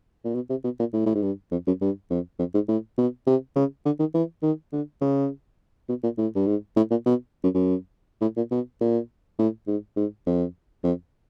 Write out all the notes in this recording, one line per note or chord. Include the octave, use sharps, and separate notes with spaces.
A#2
B2
C3
B2
A#2
A2
A2
G#2
G2
F2
F#2
G2
F2
F2
G#2
A2
B2
C3
C#3
D3
D#3
E3
D#3
D3
C#3
B2
A#2
A2
G2
G#2
A2
A#2
B2
F#2
F#2
A2
A#2
B2
A#2
A2
G#2
G#2
F2
F2